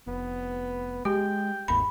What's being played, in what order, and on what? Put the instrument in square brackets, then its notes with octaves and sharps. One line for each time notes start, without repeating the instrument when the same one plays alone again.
[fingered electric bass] F1 [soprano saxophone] B3
[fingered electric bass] G#3 [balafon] G4 [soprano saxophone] G5
[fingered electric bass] G1 D#2 G#2 [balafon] B5